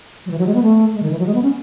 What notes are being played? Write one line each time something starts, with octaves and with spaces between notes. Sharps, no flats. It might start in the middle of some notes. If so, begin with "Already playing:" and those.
F#3
E3
F#3
G#3
B3
A3
G#3
D#3
E3
F#3
G#3
B3
C#4